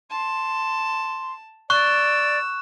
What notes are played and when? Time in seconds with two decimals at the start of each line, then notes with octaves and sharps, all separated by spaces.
0.11 A5 C6
1.70 D5 C#6 E6 F#6